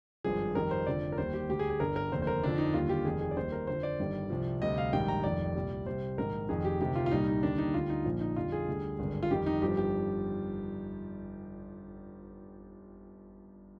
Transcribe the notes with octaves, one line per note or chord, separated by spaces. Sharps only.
G#1 G2 F3 G#4
F2 D#3 G3 A#4
C5
F1 F2 D3 F3 D5
A#4
D#2 D#3 G3 C5
G4
D2 D3 G3 G4
G#4
G#4
G1 G2 D3 G3 A#4
A#4
F1 D#2 D3 C5
C5
A#4
F2 D3 F3 D4
D#4
D#2 D3 G3 F4
G4
F1 F2 D#3 G#4
G#4
D5
D#2 D#3 G3 C5
A#4
F2 D3 F3 C5
D5
G1 G2 D#3 G3
C2 C3 F3
D2 C3 G3 D#5
F5
A#1 G#2 D#3 G3 G5
A#5
F1 F2 D#3 G3 D5
C2 A#2 G3
C2 C3 G3 C5
A#1 G#2 D#3 A#4
F1 F2 D#3 G#4
G4
D2 C3 D#3 G4
F4
F4
C2 A#2 G3 D#4
D#4
D#2 D3 G3 D4
D#4
D2 D3 G3 F4
D#4
A#1 A#2 F3
D#4
F2 D3 G3 F4
G#4
D2 D3 G3
G#1 G2 D3
F4
F2 D#3 G3 G4
D#4
G1 G2 F3 G4
G4